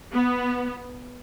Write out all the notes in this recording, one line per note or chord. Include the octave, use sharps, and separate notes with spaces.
B3